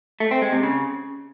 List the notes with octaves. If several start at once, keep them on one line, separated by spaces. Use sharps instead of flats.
A3
C4
G#3
C3
C#3